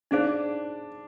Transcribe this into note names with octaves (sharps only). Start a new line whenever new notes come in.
D4 D#4 G#4 C5 F5